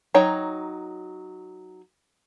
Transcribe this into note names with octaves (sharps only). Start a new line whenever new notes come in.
F#3 D#4 C#5 G5 A#5